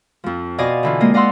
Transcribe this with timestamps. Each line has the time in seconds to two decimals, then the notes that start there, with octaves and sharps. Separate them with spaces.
0.24 F2 F3
0.58 B2 D5 D#5 F5 G#5 D#6
0.83 D3 E3 F4
1.00 G#3 A#3 C4 D#5
1.14 D5 D#5 F5 F#5 C6 E6